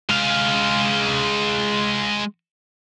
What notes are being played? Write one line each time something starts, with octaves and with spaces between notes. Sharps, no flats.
G#3 F5